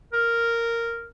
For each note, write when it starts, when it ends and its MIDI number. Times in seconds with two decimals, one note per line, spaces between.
0.13 1.06 70